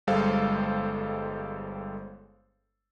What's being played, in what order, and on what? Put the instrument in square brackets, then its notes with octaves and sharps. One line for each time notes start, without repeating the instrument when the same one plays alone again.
[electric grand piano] G1 G3 G#3 A4 C5 F5